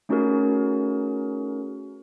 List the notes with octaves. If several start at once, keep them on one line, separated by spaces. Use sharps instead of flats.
A3 C#4 D#4 F#4 G#4 A#4